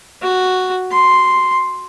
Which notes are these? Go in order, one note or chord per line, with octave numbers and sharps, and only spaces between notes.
F#4
C6